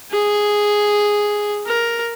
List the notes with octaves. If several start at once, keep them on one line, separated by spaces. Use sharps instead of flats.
G#4
A#4